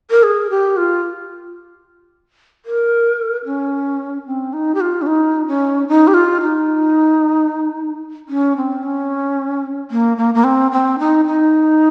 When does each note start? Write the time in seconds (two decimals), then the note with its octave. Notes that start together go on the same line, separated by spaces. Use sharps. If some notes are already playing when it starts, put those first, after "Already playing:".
0.11 A#4
0.23 G#4
0.50 G4
0.77 F4
2.66 A#4
3.46 C#4
4.27 C4
4.53 D#4
4.75 G4
4.81 F4
5.02 C#4
5.07 D#4
5.47 C#4
5.88 D#4
6.07 G4
6.14 F4
6.42 D#4
8.29 C#4
8.57 C4
8.83 C#4
9.91 A#3
10.17 A#3
10.34 A#3
10.44 C4
10.72 C4
10.99 D#4
11.26 D#4